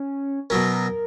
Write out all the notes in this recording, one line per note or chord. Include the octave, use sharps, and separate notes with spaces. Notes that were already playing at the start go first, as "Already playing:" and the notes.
Already playing: C#4
B2 F#3 C#4 A#4